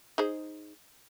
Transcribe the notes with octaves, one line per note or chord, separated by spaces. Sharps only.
D#4 G#4 C5